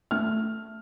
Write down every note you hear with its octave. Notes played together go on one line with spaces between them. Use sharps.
A3 F6